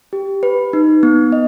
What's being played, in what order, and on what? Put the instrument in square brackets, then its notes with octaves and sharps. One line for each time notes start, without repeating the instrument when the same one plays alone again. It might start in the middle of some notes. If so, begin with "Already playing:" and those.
[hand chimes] G4
B4
D#4
B3
D#5